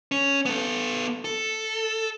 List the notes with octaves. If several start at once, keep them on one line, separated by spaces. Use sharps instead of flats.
C#4
B3 A4
A4